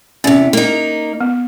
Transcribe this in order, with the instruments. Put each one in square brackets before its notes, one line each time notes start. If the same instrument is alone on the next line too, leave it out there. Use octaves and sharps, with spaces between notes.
[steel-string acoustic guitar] E2 C3 [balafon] C#4
[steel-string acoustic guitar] A#3 D#4
[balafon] B3